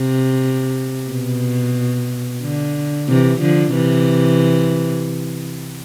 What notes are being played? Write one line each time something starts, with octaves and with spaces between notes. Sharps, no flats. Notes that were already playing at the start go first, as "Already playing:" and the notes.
Already playing: C3
B2
D3
C3 E3
D3 F3
C3 E3